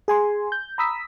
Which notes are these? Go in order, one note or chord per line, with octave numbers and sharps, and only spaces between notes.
G#4 G#5 C6
G6
A#5 B5 D#6 E6 B6